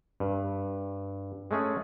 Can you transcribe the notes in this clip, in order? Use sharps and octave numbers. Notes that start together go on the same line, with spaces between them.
G2
G#3 A3 C#4 G#4